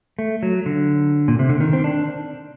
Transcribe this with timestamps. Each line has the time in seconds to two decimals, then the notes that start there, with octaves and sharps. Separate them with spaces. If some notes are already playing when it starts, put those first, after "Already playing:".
0.19 A3
0.43 F#3
0.66 D3
1.28 A#2
1.39 C3
1.49 D3
1.60 D#3
1.73 C4
1.84 D4